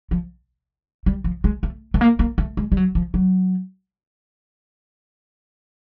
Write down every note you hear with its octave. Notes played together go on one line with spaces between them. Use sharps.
F3
G3
F3
G#3
A3
A3
A#3
A#3
A3
G#3
G3
F#3
F3
F#3